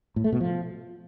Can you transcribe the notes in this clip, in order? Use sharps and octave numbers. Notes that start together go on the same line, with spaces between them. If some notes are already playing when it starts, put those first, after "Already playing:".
A2
A3
B2
F3